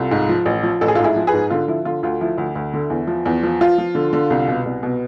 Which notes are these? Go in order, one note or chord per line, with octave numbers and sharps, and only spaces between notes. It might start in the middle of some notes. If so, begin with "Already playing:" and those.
Already playing: C2 F4 A4
G#2
F3
A1
F3
A1 A4
G#4
F4 A4
G#2
E4 G#4
F3
G#4 B4
G#2
D3 F4
F3 E4
D3 F4
D2 F4
F3 E4
D2
D2
D3
E2
F3
E2
F3
F3 F4
F3
D3
D3
C2
B2
C2
B2